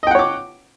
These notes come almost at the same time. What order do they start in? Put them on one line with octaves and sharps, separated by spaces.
D#5 G5 F#5 C#5 D6